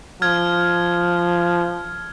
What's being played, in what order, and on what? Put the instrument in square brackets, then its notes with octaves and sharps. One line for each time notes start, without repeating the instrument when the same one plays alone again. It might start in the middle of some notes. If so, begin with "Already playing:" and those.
[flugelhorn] F3 [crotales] F6 G#6